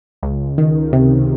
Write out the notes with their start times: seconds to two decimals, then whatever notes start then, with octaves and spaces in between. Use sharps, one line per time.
0.23 C#2
0.58 D#3
0.93 C3